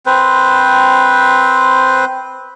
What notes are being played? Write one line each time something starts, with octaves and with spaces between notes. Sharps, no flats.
C4 B4 C5